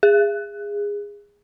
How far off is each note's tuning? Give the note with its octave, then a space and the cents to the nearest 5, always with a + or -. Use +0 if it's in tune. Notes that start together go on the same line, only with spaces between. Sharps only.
G#4 -20